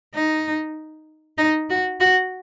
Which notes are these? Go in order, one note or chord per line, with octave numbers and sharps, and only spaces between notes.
D#4
D#4
F#4
F#4